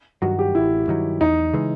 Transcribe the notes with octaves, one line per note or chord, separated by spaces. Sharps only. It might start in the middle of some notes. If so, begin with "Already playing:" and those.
G2 D#3 F#3 F#4
G4
A1 E4
G2 D#3 F#3
E2 D#4
C#3 E3 G#3